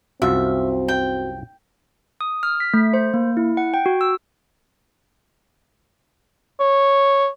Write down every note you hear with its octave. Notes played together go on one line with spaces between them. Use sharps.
C2 F#2 C4 F4 F#4 E5
G5
D#6
F6
B6
A3
C5
A#3
E4
F#5
G5
F#4
E6
C#5